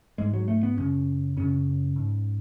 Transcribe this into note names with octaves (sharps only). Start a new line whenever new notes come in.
G#2 G#3
F#3
A3
B3
F#2 C#3 C#4
F#2 C#3 C#4
G#2